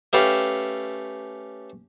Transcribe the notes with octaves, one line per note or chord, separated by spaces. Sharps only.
A3 C#4 G4 A4 B4 F5